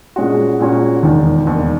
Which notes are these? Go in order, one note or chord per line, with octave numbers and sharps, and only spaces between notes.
A#2 G#3 C#4 F#4
A#2 G#3 C#4 F#4
E1 D#2 D#3
E1 D#2 D#3